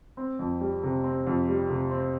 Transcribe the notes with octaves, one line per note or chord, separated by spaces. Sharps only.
C4
F2
G3
C3
C4
F2
G3
C3
C4